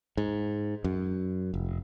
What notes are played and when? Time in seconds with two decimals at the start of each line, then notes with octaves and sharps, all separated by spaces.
0.17 G#2
0.84 F#2
1.54 F1